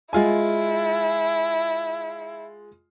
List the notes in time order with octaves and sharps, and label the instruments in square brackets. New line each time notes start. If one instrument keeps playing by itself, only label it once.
[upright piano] G#3 F4 G#5 [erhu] E4